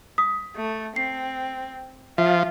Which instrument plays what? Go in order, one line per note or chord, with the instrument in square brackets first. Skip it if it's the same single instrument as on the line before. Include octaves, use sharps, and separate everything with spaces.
[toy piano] D#6 [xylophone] B6
[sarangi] A3
[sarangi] C4 [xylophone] C7
[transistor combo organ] F3 [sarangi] F4 [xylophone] E5